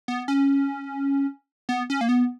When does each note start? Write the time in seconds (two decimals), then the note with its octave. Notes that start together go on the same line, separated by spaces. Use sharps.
0.08 B3
0.28 C#4
1.69 B3
1.90 C#4
2.01 A#3
2.09 B3